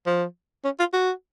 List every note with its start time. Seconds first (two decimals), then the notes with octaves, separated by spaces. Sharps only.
0.06 F3
0.65 C#4
0.79 F4
0.93 F#4